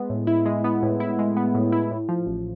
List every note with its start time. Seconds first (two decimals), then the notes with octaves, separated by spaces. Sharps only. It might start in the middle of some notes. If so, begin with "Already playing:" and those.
Already playing: G#3 B3
0.10 A2
0.27 E4
0.46 G#3
0.64 B3
0.83 A2
1.00 E4
1.19 G#3
1.37 B3
1.54 A2
1.72 E4
1.91 A2
2.09 F3
2.27 A1